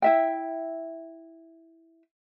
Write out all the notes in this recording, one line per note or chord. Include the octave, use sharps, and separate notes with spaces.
E4 E5 G5